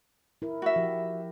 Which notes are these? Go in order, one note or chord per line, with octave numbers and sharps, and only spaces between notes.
E4 A#4
F#4 E5
F3 G4